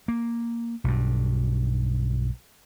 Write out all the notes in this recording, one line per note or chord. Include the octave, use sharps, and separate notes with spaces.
A#3
B1 G2